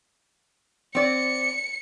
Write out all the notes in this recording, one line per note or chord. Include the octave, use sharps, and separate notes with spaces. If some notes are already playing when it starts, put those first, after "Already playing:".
C4 D5 C#7